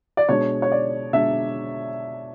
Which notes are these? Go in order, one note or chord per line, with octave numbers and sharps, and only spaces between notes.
D5
B2 G#3 D4 C#5
C#5
D5
B2 G#3 D4 E5